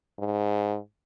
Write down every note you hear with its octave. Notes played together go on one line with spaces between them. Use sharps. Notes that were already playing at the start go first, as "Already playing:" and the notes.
G#2